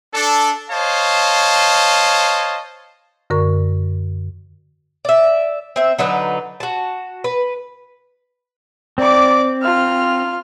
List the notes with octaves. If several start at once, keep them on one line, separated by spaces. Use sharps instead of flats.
D4 A4
C5 C#5 D#5 F5 A5
F#2 D3 A#4 C#6
D5 E5
C4 E5
D3 F#3 D#4 B4
F#4 A5
B4
C4 D5 D6
F4 F6